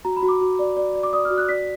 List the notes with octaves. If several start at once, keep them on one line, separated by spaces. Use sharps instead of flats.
F#4 A#5
B5
F#4
D6
F#4
D5
D5
D5
D6
D5 D#6
F6
F#4
F#6
D5 B6